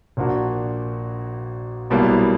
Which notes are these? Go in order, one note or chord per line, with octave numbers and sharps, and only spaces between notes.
A#1 A#2 A#3 D4 F#4
B1 B2 G3 A#3 E4